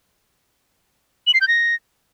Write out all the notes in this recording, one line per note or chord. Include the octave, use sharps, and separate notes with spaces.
F#7
C7
G6
A#6